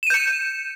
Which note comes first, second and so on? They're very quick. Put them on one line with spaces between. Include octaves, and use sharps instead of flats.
E7 D#7 G6 C#7